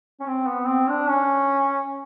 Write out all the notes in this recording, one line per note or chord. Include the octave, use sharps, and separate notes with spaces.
C#4
C4
B3
C4
D4
C#4